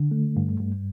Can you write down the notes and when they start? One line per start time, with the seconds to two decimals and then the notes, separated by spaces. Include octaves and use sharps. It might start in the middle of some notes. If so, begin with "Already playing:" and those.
Already playing: D3
0.11 A3
0.36 G2
0.60 G2